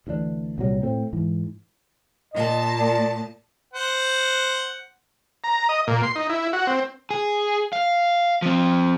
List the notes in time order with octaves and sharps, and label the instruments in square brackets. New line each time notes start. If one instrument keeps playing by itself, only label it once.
[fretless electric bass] D2 E3 G#3 D4
C2 A#2 F#3 G3
A2 A3 C4
G#2 E3
[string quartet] A#2 A5 [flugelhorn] D#5
[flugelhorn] D5
[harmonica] C5 F#5
[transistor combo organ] A#5
D#5
A#2
C6
D#4
E4
F#4
C4
[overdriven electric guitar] G#4
F5
F3 C4